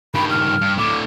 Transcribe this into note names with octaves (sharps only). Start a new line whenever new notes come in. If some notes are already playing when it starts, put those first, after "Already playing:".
G2 D#3 B5
F6
G2
A2 D3 D6